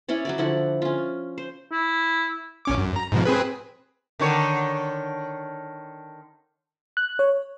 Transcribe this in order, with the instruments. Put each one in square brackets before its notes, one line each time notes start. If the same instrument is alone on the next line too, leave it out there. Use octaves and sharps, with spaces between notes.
[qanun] C#4 E4 C#5 D5
F#3 F#4 D5
D3 F3 E4 F#5
C#4 F4
C5
[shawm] E4
[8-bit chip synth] A#1 C#4 D6
F#2
A#5
G#2 B2 F3
C4 G#4 B4
[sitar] D3 D#3 C#5
[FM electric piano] F#6
C#5